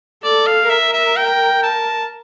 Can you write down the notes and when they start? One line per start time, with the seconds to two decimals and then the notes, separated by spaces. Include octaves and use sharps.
0.24 A4 D5
0.47 F5
0.70 A#4 E5
0.93 E5
1.17 G5
1.63 A5